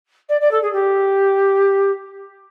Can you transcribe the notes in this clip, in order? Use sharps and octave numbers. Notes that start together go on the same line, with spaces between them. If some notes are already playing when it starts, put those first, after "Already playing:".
D5
D5
A4
G#4
G4